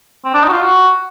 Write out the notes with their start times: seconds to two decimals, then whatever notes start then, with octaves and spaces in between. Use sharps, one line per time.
0.25 C4
0.34 D4
0.43 D#4
0.48 F#4
0.52 F4
0.62 F#4